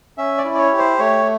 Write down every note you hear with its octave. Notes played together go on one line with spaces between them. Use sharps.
C#4 E5
D5
E4
D5
C#5
G4
C5
A3 C#5